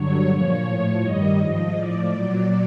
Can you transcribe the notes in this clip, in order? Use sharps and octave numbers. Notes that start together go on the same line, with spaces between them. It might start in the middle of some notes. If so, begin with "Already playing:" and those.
Already playing: G2 D3 F#3 C#5
A#2 F3
A2 F3
G2 D#3 G3 D#5
G#2 F3 D#5
A2 F3 D5
A#2 F#3